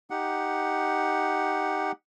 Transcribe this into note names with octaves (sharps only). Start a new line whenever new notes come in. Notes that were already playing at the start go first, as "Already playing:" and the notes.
D#4 G4 F#5